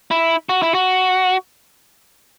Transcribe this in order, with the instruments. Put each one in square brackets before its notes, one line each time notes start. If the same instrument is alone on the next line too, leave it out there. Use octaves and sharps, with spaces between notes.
[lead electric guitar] E4
F#4
E4
F#4